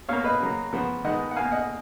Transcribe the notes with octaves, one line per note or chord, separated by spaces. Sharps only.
B2 A#3 C#5 F5
B4 D#5
C#3 F#3 A#3
C#3 F3 B3
D#3 G#3 B3 D#5 F#5
F#5
B2 A#3 F5 G#5
D#5 F#5